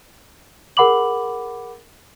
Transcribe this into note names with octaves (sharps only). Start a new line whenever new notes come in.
G#4 A#4 F#5 B5 D6 F#7